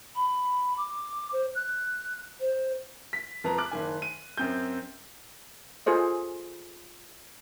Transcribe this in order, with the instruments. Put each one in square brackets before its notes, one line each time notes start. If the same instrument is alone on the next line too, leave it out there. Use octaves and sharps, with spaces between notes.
[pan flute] B5
D6
C5
F#6
C5
[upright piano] B6
F2 B4 A#5
D6 F#6
F#1 D#3 G#5
D#7
F#2 C4 G6
[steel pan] F4 G#4 A4 C5 D#5